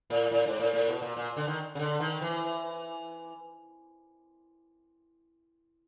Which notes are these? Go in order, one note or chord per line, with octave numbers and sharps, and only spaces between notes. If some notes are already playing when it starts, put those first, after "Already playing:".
A2
A2
G#2
A2
A2
B2
A#2
A#2
D3
D#3
C#3
D3
D#3
E3